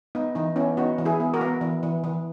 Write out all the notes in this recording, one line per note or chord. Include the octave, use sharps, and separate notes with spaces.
B3 D#4
E3 D#4
B3 C#4 E4
B3 D#4 F#4
E3
E4 G#4
B3
F#4 A#4
B3
E3
E3
E3